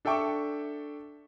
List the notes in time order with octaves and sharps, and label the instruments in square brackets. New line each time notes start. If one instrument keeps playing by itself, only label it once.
[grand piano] D4 A4 E5 G5 C#6 D6